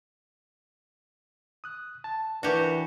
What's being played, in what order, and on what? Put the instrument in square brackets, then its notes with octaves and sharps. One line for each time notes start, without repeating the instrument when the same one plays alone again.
[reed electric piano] D#6 F#6
A5
[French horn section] E3 [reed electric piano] D4 A#4 [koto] F#4 G4